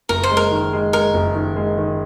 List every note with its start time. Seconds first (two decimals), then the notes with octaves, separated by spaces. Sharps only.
0.09 F#1 A#4
0.23 C5
0.31 G#3
0.37 A#4
0.52 D#3
0.73 G#3
0.93 G#3 A#4
1.14 F#1
1.35 D#3
1.56 G#3
1.78 D#3